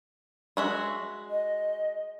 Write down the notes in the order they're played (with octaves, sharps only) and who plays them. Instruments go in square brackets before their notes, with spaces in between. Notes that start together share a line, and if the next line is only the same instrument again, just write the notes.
[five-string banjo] G#3 F#4 E5
[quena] D#5